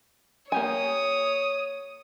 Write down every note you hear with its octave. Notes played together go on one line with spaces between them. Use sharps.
A#3 G4 C#5 G#5 D#6